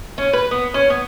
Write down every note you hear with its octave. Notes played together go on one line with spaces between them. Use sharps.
C#4
B4
B3
C#4
B3